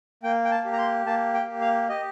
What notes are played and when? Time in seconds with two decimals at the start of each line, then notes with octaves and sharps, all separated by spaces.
0.23 A#3 G5
0.45 G5
0.51 A5
0.65 G4
0.73 A#5
0.78 C6
1.06 A#3 A5
1.34 G5
1.48 G4
1.61 F5
1.89 G4 D#5